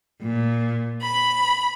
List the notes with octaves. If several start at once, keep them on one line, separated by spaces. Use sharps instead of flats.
A#2
B5